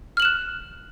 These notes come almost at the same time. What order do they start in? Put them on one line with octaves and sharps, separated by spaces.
F6 F#7 E7 F#6